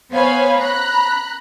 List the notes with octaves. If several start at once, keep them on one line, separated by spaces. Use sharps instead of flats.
B3 C5 C#5 F5 G#5 B5
A#5 B5 F#6